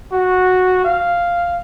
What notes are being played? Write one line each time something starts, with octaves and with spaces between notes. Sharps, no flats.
F#4
F5